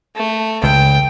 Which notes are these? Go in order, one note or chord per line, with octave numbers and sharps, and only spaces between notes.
A3
C#2 G5